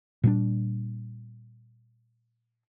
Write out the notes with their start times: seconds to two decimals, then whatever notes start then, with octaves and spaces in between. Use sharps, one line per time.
0.24 A#2 G3 D4